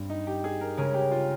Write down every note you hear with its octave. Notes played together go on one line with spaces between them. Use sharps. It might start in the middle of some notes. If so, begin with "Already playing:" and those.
Already playing: G2 G3 C4
D#4
G4
G#4
A#4
C#3 G#3 C#4 A#4
G4
F4